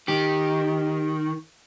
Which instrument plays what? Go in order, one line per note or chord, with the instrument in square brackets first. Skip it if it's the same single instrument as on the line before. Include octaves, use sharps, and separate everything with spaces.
[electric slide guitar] D#3 [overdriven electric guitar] G4